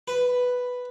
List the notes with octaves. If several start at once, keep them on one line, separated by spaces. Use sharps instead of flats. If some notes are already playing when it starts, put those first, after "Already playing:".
B4